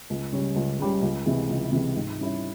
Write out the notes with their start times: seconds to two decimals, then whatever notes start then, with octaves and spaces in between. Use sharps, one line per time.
0.10 C#2
0.33 C#3 G3 C#4
0.56 C#2
0.79 C#3 G3 C#4
1.02 C#2
1.26 C3 E3 G#3
1.49 C#2
1.72 C3 E3 G#3
1.96 G#2
2.19 G3 C#4 E4